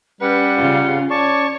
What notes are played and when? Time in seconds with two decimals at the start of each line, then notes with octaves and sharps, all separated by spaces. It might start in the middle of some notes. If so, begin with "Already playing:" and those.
0.21 G3 C#4 B4 F#5
0.57 C#3 F4
1.10 C#5 D5 A5 C#6